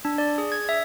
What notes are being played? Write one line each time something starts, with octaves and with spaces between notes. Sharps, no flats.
D4
D5
G#4
G#6
E5